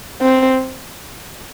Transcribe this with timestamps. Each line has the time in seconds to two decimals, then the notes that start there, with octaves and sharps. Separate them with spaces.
0.21 C4